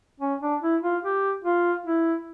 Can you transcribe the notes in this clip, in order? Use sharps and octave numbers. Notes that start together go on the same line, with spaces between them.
C#4
D4
E4
F4
G4
F4
E4